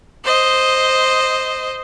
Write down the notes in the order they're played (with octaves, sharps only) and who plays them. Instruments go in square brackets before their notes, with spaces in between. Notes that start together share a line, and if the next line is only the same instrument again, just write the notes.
[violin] C5 D#5